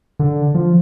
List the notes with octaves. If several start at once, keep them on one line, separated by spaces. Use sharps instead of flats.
D3
F3